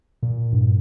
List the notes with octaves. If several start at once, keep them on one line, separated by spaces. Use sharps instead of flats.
A#2
G2